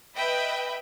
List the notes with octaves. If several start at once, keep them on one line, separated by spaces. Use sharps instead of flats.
B4 D#5 E5 G5 B5